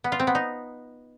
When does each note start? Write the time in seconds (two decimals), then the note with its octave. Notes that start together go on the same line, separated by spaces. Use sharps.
0.04 B3
0.12 F4
0.20 C4
0.27 B3
0.35 D#4